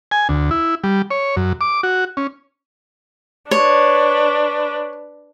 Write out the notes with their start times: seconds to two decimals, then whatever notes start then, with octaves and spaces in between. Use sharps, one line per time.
0.11 G#5
0.29 D2
0.51 E4
0.84 G3
1.11 C#5
1.37 F#2
1.61 D6
1.83 F#4
2.17 C#4
3.51 D4 B4 C#5